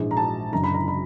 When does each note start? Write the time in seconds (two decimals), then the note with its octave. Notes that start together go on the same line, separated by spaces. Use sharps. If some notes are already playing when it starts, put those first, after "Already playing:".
Already playing: A#1 G#2 E3 G#3
0.11 A#5
0.17 A5
0.52 F#1 F#2 D3 A#5
0.64 B5
0.74 A#5
0.88 B5